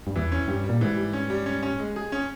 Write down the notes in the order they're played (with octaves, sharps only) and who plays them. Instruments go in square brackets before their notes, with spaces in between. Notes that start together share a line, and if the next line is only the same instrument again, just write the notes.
[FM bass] G2
[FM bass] E2 [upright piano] E3
[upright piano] C#4
[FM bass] G2 [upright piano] G3
[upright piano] G3
[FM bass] A#2
[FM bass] G#2 [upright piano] E3
[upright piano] G3
C#4
G3
C#4
C#4
G#3
G#4
C#4